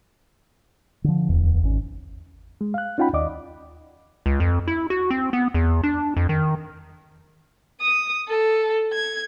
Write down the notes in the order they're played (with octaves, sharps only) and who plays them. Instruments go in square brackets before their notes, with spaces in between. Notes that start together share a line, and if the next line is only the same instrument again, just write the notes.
[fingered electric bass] D3 F3
D1 E2
G#1 C#4
[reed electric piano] G#3
F5 F#6
C#4 D#4 F4 F#5 G5 B5
D#2 D5 D#5 D6
[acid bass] C#2
F2
E4
F#4
C4
B3
E2
D4
F2
D#3
[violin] D#6
A4
G#6